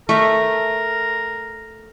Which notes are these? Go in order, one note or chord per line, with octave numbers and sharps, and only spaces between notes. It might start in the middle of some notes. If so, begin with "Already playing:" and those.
A3 A#4 E5